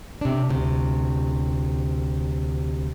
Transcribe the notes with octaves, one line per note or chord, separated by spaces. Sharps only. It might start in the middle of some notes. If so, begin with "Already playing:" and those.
C3 D4
D2 C3